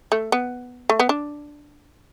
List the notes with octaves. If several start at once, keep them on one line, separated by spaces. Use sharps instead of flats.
A3
B3
A3
B3
D4